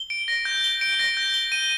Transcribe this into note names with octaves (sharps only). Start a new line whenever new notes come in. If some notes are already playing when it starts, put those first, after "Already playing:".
Already playing: G7
D7
A#6
G6
G7
D7
A#6
G6
G7
D#7